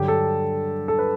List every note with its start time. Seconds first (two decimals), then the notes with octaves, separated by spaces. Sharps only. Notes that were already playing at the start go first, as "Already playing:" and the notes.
Already playing: G2 D3 F#3 G4
0.08 A4
0.88 A4
0.99 B4